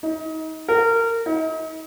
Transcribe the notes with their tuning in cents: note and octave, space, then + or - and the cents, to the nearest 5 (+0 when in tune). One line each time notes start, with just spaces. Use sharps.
D#4 +30
A#4 -25
D#4 +40